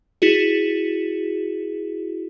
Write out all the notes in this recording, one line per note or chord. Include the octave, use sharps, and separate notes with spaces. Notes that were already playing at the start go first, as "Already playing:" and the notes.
E4 F#4 G#4